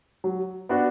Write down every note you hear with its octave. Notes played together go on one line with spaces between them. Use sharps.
F#3
B3 D4 F#4